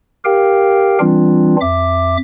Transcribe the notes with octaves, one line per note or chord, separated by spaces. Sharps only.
G4 A#4 F5 G5
E3 G3 C4 D4 F4
F2 E5 D6